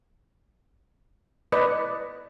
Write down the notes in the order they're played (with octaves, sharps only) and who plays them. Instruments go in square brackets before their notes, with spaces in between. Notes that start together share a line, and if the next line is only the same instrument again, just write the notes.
[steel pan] B4 D5 D#5